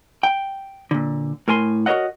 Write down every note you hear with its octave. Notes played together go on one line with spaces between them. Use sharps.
G5
A#2 D3
A2 A#4 G#5 C6
F#4 A#4 C5 C#5 D#5 F#5